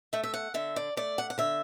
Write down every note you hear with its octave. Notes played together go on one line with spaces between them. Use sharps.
A3 E5
E5
F#5
D3 E5
D5
A3 D5
F#5
F#5
D3 E5